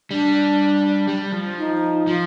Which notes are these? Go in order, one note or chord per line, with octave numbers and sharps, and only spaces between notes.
G3 D4
G3
F3
D#4
F3 F4